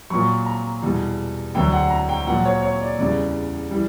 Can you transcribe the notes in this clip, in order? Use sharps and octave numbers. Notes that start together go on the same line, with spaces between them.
A#2 F#3 C#6
A#5
E2 B2 G3
D2 D3 F#3 G5
F#5
A#5
G5
A#2 F#3 F#5
C#5
C#5
D5
E2 C#3 E3 G3 D5
E3 G3